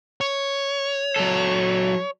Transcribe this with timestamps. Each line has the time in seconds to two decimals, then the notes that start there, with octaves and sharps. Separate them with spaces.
0.21 C#5
1.16 F#3 A4